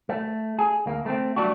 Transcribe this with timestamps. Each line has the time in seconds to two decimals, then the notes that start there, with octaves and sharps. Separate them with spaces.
0.09 A3
0.59 G#4
0.86 D2 A#3
1.06 A3 C4
1.36 F#3 G3 A3 D4 F#4